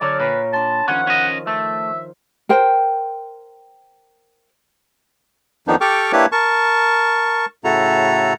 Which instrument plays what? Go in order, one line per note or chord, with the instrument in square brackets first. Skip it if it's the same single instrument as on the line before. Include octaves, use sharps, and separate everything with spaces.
[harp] D3 C#5 F6 [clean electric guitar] F#3 [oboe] D5
[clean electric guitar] A#2 [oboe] B4 [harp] C#5 C#6
[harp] D4 B5 C6 [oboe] A5
[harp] D#3 F3 F4 [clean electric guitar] C#4 [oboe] F#5
[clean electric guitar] C#4 D#5
[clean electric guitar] A3 [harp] C5 [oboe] E5
[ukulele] A#4 C5 G5
[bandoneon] F2 D#3 F3 B3 D4 D#4
G4 A4 G5 C#6 D6 F6
A#3 D4 E4 G4 B4 C#5
A#4 A5 C#6
A2 C#3 E4 F#4 A4 A#5